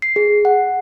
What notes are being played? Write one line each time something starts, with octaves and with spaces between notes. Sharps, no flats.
C7
G#4
F#5